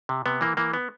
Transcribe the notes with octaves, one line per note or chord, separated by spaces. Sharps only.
C3
C3 B3
E3 A#3
E3 A#3
B3